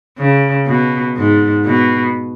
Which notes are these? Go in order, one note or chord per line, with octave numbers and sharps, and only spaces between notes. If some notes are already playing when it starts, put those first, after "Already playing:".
C#3
B2
G#2
B2